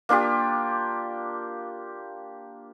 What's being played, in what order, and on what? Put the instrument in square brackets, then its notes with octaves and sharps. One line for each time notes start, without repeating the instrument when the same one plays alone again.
[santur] A#3 D4 F4 G4